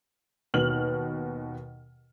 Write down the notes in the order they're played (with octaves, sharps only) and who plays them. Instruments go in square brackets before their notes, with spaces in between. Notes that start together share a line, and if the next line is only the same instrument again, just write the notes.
[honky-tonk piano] D#2 B2 F6 F#7